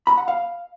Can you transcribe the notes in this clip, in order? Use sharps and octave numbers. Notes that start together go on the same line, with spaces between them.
B5
F#5
F5